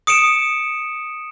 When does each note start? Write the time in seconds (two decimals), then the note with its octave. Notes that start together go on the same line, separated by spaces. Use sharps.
0.07 D#6 C#7 D7 E7